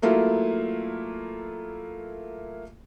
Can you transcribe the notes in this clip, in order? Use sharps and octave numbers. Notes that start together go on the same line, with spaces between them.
F#3 A3 A#3 E4 F4